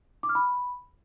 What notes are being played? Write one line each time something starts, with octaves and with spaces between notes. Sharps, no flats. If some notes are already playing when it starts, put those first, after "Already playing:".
D6
F6
B5